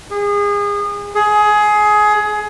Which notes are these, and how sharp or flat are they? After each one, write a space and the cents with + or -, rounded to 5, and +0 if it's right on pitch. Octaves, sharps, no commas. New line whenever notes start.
G#4 -30
G#4 +20